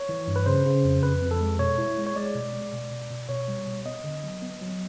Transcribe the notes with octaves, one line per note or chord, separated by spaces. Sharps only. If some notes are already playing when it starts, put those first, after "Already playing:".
Already playing: C#5
E3
G2
B4
C#3 C5
C#3
F2
F2 B4
F2
A4
G#3
B2 C#5
E4
G#3
C#5
G#3 D5
B2
G#3
B2
B2
B2
B2 C#5
G3
B2
B3 D#5
D3
F#3
B3
F#3